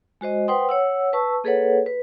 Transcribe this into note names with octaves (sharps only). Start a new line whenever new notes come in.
G#3 F#4 C5 D#5
B4 C5 F#5 G5 C6 D#6
C#5 F#5 E6
B4 A5 C#6 E6
A#3 G#4 A4 B4 C#5 F#5
B4